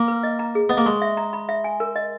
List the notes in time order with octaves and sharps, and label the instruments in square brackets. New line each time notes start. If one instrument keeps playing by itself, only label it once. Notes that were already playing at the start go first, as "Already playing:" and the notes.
Already playing: [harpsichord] A#3
[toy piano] B4
D#5
A#5
G#4
[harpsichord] B3 [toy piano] D#5
[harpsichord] A#3
[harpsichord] G#3 [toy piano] C#6
[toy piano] E5
A#5
B5
E5
G#5
A#4
D#5